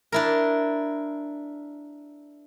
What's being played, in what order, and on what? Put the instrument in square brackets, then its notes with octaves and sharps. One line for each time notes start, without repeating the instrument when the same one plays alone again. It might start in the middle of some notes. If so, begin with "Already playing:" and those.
[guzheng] D4 E4 A#4